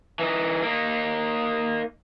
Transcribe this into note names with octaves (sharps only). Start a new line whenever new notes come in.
E3 D#4
A#3 D#4